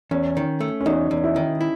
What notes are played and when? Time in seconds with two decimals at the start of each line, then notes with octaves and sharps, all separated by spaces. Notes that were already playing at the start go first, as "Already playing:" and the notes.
0.11 E2 C#4
0.37 D#3
0.60 A3
0.81 C#4
0.86 E2 D#4
1.11 E2
1.24 E4
1.36 D#3
1.61 E4